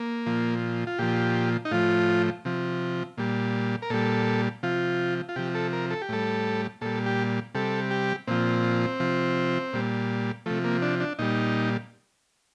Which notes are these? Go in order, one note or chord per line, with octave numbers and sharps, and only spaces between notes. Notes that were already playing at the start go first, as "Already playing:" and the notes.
Already playing: A#3
A#2 F3
F4
A#2 F3 G4
D#4
A2 F3 F4
C3 F3
A#2 G3
A#4
A#2 G3 A4
C3 F3 F4
F4
C3 F3 G4
A4
A#4
A4
G4
A2 G3 A4
A#2 G3 A4
G4
C3 G3 A4
G4
A#2 F3 C4
C3 F3
A#2 G3
C3 F3 A3
A#3
D4
D4
A#2 G3 D#4